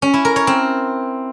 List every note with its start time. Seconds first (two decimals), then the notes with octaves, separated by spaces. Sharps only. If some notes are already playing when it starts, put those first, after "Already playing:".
0.02 C#4
0.14 E4
0.25 A#4
0.36 C#5
0.47 C4